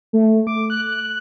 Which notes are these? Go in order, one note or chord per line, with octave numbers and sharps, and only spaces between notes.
A3
D6
F#6
F#6